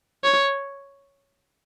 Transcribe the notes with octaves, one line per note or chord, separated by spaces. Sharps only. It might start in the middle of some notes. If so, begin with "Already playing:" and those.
C#5